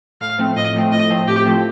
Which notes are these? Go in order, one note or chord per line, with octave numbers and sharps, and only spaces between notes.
A2 F5
F3 A3 C4
A2 D#5
F3 A3 C4
A2 D#5
F3 A3 C4
A2 G4
F3 A3 C4